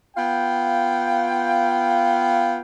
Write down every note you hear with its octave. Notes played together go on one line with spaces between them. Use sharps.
B3 F4 F5 G5